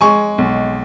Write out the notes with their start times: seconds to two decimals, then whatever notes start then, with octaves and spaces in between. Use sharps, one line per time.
0.01 G#3 G#5 C#6
0.38 B1